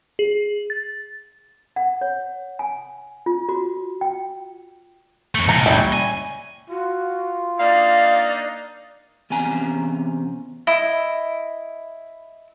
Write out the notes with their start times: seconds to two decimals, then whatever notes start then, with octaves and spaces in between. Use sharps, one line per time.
0.19 G#4
0.70 A6
1.76 F#5
2.01 C#5
2.59 G#5
3.26 F4
3.49 F#4
4.01 G5
5.35 F2 A3
5.49 C#2 A#2 A#5
5.66 G3 C#4 E4
5.93 G#5
6.70 F4 F#4
7.60 A#3 D4 D#4 D5 F5
9.30 E2 C3 C#4 G#5 A#5
10.67 E4 D#5